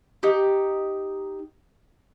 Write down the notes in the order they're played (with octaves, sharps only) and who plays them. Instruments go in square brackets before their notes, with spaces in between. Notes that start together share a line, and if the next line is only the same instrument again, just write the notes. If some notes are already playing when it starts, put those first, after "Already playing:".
[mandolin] D#4 G4